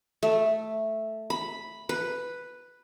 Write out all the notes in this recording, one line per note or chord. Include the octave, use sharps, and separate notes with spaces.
A3
B5
B4